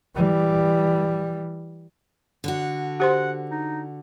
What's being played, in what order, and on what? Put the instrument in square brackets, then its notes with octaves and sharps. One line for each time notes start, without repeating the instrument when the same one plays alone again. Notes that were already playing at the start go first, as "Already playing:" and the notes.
[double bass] E3 G3
[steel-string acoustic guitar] D3 D4 F#4
[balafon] G4 C5 C6 [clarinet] F#5
[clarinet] D#4